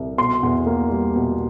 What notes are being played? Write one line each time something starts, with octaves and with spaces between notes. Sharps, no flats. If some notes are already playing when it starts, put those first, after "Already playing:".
Already playing: C2
B2 C6
E2
A#3
G3
B2